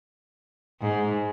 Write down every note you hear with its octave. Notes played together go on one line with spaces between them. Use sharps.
G#2